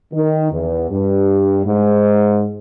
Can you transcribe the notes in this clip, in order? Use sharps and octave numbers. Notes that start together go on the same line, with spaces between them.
D#3
E2
G2
G#2